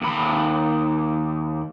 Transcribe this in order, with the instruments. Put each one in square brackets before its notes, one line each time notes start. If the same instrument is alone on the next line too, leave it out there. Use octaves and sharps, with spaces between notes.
[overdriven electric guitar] D#2 B5